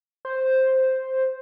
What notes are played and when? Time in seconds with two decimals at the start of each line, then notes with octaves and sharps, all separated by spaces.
0.25 C5